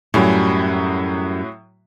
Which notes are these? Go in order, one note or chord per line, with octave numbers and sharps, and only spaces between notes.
F#2 A2 F#3 G3